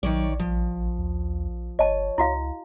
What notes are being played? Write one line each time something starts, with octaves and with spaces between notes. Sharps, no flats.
A#1 D#3 F#3 C#5 D5
A1 F3
D#2
G1 C#5 D#5 A5
C#2 E4 F#4 F5